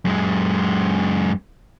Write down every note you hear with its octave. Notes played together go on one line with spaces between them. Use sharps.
F#2 G#3